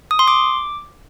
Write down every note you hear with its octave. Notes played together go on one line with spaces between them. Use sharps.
D#6
C6
D6